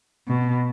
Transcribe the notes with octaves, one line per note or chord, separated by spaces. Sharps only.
B2